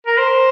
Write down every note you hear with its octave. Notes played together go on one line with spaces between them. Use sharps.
A#4
C5